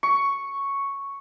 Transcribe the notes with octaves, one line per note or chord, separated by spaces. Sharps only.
C#6